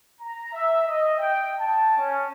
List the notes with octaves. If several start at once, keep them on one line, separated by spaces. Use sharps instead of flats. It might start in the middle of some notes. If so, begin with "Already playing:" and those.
A#5
E5
D#5
G5
A5
C#4